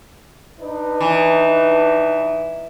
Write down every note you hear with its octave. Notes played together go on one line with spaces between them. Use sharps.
D4 D#4 B4
E3